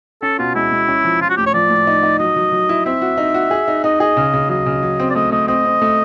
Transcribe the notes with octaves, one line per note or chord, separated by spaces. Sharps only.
C#4 A4
B2 F4
G#3 E4
G#3
C#4
F3
F3 F4
F#4
A2 G4
C#5
F3 D5
A2
D#4
D#4
F#3 D#5
F#3
F#3
E4
C4 E5
F#4
D#4
F#4
G#4
D#4
D#4 D#5
G#4 D#5
C#3
C#3
F#3 D#5
C#3
F#3
C4
D5
A3 D#5
A3 D#5
C4 D#5
C4
A3